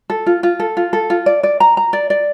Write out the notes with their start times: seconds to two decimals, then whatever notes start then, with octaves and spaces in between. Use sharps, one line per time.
0.10 A4
0.26 F4
0.43 F4
0.60 A4
0.77 F4
0.93 A4
1.10 F4
1.26 D5
1.43 D5
1.60 A#5
1.77 A#5
1.93 D5
2.10 D5